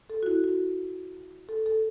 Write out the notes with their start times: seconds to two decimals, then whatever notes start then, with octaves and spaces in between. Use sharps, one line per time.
0.10 A4
0.23 F#4
0.26 E4
0.44 F#4
1.49 A4
1.66 A4